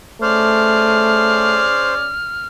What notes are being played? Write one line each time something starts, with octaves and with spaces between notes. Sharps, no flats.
A3 C#4 G#4 C5 D5 F6